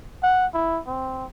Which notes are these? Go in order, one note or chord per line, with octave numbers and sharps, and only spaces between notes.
F#5
E4
C4